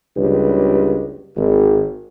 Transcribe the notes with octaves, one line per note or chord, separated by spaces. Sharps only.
F#1 C#2 G3 D4 G4 B4
G#1